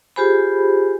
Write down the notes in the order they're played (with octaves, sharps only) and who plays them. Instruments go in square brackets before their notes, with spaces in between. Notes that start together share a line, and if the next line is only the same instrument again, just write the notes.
[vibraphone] F4 G4 G#4 C5 G#5 B5